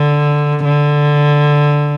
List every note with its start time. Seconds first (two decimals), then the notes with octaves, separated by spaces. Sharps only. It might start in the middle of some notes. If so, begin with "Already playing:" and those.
Already playing: D3
0.65 D3